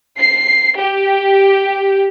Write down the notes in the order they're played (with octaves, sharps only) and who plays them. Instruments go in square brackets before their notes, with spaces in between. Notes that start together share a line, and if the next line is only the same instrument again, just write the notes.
[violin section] C7
G4